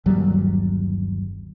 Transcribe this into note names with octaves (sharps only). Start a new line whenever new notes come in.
G1 D#2 F#3 G3